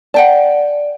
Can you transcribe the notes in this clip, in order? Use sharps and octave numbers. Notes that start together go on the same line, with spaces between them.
D5 F#5 G5 A5